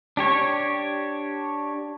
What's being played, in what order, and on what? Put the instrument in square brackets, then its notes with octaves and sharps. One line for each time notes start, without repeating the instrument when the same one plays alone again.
[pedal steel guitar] D4 G4 C#5